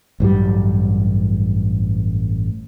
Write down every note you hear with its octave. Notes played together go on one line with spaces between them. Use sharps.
A1 G2 F#3 G3